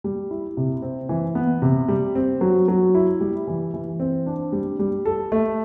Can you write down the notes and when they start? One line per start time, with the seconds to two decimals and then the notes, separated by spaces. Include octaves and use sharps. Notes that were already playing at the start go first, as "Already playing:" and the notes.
0.04 G3
0.31 E4
0.57 C3
0.82 C4
1.09 E3
1.35 B3
1.62 C3
1.88 G3
2.15 C4
2.41 F#3
2.68 F#3
2.95 E4
3.20 G3
3.47 E3
3.74 E3
4.00 C4
4.26 D4
4.52 G3
4.79 G3
5.05 A4
5.32 A3